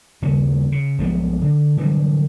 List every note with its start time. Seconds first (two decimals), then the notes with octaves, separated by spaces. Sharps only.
0.22 D#2 C#3 G3 C#4
0.72 C#3
0.98 B1 F3 G#3 B3
1.42 D3
1.77 D3 E3 F#3 G3